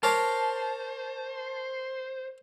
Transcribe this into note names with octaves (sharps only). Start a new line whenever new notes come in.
A#4 C5 C#5 A5 D6